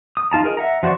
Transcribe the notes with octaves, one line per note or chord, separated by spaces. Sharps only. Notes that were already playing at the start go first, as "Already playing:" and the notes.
D#6
D#4 F4 A5 A#5
G#4 A#4 D#5
E5 F#5 A#5
F3 F#4 C5 D5 C#6